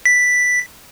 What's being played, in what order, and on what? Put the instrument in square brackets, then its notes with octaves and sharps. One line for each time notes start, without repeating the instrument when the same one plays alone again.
[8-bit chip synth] B6